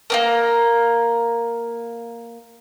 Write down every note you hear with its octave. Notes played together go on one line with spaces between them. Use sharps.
A#3 C4 A#4